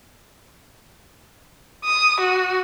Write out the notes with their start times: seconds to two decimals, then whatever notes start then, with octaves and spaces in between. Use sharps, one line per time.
1.84 D#6
2.20 F#4